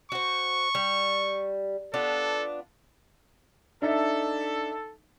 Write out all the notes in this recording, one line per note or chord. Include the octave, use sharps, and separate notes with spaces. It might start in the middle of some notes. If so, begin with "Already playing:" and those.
F#4 C5 C#6
G3
B3 D4 F4 A4
D4 D#4 A4 E5